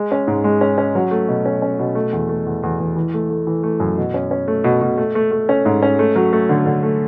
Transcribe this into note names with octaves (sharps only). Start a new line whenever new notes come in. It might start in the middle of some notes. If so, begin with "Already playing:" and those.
Already playing: G#3
C#4
G#2
G#3
C#4
C#4
F#3
A3
B2
C#4
C#4
B2
A3
E2
A3
E2
E2
E2
E3
A3
A3
E3
A3
F#2
B2
C#4
C#4
A3
B2
B2
A3
A3
A3
C#4
G#2
C#4
A3
F#3
A3
D3
D3
A3